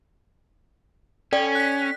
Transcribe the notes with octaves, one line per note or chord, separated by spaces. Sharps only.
C#4 A4 D5 G5
F#6 B6